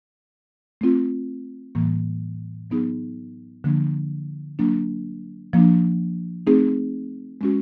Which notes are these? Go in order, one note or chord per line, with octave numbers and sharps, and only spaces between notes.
A3 C4 F4
A2 E3 G3 A#3
F#3 B3 D#4 G#4
D3 F3 A#3 D4
F#3 A#3 D4
F3 A#3 D4
A3 C4 D#4 G#4
G#3 C#4 F#4